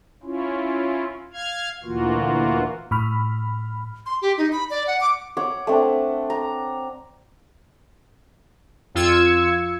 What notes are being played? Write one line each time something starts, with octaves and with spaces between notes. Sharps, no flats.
C#4 E4 F4
F5 F6 G#6
D2 A#2 E3 A#3 F4 F#4
A2 B5 F6
C6
G4
D#4
B5
D5
F#5
D6
C#5 F#5 D6
A3 C4 D4
A#5
F2 F4 E6 G#6 C#7